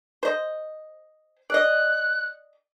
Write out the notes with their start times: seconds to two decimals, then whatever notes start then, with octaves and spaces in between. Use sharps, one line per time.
0.23 C5 D#5
1.50 D5 D#5 F#6